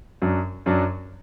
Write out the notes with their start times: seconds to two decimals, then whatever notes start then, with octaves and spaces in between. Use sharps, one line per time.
0.22 F#2 F#3 D4
0.66 F#2 F#3 D4